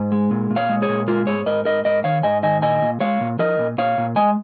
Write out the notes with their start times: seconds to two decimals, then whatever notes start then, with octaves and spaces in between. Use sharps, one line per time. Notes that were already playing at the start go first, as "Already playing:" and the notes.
Already playing: G#2
0.12 G#3
0.31 A#2
0.50 A#2
0.56 C#5 F5
0.69 G#3
0.82 G#4 C#5
0.89 A#2
1.07 G#3 F4 A#4
1.27 G#2 G#4 C#5
1.46 G#2 A#4 D#5
1.65 G#2 A#4 D#5
1.85 G#2 A#4 D#5
2.04 D#3 C#5 F5
2.23 G#2 D#5 G#5
2.43 D#3 D#5 G#5
2.62 A#2 D#5 G#5
2.82 A#2
3.00 G#3 C#5 F5
3.21 A#2
3.39 F3 A#4 D#5
3.59 A#2
3.78 A#2 C#5 F5
3.98 A#2
4.16 G#3 D#5 G#5